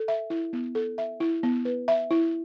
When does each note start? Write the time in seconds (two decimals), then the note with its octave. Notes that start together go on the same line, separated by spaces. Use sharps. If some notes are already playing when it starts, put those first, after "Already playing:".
Already playing: A4
0.08 E5
0.30 E4
0.53 B3
0.75 A4
0.98 E5
1.20 E4
1.43 B3
1.65 B4
1.88 E5
2.11 E4